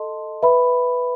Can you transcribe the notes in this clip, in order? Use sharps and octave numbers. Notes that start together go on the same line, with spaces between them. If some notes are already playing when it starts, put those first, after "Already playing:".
Already playing: A4 D#5 A5 C6
B4 E5 B5